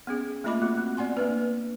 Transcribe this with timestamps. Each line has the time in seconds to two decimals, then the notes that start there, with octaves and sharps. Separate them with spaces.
0.07 B3 C#4 G#4
0.44 A3 A#3 F4 D#5 B5 D6
0.62 C4 F#4
0.77 C4
0.97 B3 D5 F#5 G#5 C6
1.17 A#3 D4 B4